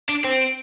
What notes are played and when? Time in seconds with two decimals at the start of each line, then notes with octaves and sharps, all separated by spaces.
0.09 D4
0.24 C4